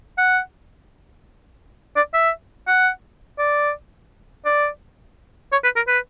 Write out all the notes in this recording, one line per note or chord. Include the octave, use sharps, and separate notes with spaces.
F#5
D5
E5
F#5
D5
D5
C#5
B4
A#4
B4